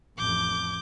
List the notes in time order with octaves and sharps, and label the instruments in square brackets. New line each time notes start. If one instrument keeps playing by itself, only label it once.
[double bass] A1 F2 [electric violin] D6 G6